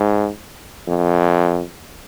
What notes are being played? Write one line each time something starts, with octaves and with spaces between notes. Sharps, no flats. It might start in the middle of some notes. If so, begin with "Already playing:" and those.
Already playing: G#2
F2